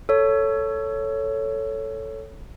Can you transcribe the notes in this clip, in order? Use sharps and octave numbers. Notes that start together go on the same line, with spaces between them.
A4 C#5